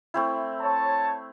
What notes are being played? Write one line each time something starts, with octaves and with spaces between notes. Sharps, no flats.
A3 C4 E4
C#5 A5